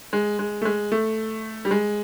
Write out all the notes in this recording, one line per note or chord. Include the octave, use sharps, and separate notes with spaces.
G#3
G#3
A3
G#3
A3
G3
G#3